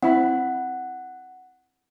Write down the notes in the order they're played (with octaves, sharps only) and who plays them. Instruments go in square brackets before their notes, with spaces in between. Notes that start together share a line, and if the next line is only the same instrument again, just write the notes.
[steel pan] C4 E4 B5 [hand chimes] F#5